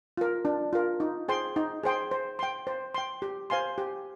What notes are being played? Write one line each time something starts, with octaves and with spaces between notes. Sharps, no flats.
F4 A#4
D4
F4 A#4
D#4
G#4 C5 G5 C6
D#4
G#4 C5 G5 C6
C5
G5 C6
C5
G5 C6
G4
C5 F5 G#5 C6
G4